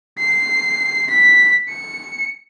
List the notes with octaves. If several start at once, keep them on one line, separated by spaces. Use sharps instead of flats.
C7
B6
C#7